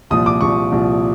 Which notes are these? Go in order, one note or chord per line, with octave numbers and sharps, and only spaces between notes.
C2 A#2 F3 D#6
D6
C2 A#2 F3 C#6
C2 A#2 F3